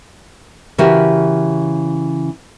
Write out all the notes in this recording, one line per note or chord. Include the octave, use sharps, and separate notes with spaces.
C#3 E3 F#4 G4 A#4